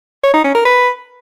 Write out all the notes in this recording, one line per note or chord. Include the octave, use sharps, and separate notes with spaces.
C#5
D#4
C#4
A#4
B4